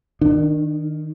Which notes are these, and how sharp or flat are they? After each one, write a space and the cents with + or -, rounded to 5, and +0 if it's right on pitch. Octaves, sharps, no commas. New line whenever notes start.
D#3 +0 D4 +30